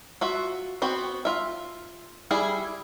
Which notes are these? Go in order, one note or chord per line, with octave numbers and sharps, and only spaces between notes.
F4 F#4 E5
B3 C4 F#4
F4 E5
G3 E4 G#4